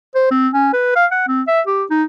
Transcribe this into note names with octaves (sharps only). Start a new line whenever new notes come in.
C5
C4
C#4
B4
F5
F#5
C4
E5
G4
D#4